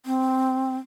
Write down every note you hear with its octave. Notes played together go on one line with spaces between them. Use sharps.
C4